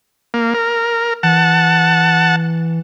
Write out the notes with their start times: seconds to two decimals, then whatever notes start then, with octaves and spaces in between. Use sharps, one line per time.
0.34 A#3
0.54 A#4
1.23 E3 F#5 A5